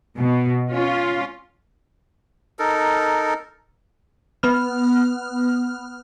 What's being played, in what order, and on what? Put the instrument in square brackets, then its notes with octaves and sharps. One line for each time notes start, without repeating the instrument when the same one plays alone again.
[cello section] B2
C#4 F4
[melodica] D#4 A4 A#4
[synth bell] B3 F6